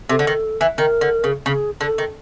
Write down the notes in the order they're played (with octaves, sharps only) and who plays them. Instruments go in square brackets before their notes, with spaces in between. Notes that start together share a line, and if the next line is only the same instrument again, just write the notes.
[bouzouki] C3 [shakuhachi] A4
[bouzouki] D3
D#3
E3
[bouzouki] D#3 [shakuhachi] A#4
[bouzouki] D3
C#3
[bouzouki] C#3 [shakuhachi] G#4
[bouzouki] D3 [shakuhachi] A4
[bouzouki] D#3